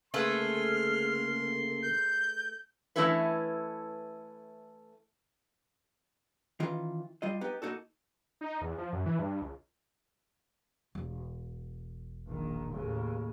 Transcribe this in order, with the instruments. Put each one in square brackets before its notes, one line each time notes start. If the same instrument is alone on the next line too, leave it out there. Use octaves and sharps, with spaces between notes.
[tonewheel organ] C#3 A#3 [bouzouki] A3 G#4 B4 [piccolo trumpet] C6 [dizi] F6
[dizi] G6
[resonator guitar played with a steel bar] E3 A3 C#4 E4 A4 B4
[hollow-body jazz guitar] D#3 E3 C#4 F4
G3 F4 D#5
B3 D#4 G4
A#3 D#4 F#4 A4
[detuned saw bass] D#4
E2
F3
F#2
E3
G2
C#2
[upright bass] E1
[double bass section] A#1 D#3
D#2 A2 C#3